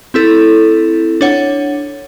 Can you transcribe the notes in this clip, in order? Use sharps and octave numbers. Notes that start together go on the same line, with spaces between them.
C4 E4 A4
D4 C#5 F#5